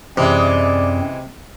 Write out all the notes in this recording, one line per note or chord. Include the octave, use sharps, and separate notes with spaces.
F#2 C3 E3 G#3 C4 D5